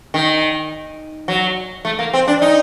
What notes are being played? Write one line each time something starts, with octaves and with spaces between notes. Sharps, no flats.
D#3
F#3
A3
A#3
C4
D4
D#4